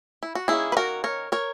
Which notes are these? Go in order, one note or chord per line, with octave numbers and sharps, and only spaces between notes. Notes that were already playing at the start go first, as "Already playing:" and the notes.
E4
F#4
D#3 A#3 C#4 E4 G#4
B4
F#4 A#4
A#4 C#5
A#4 C#5